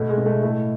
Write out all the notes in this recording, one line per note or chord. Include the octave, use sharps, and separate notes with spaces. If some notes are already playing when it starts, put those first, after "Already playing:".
Already playing: B2 A3
G#3
B2
A3
A2 A3